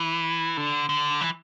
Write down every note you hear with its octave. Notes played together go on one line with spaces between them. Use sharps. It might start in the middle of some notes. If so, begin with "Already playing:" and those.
Already playing: E3
D3
D3
E3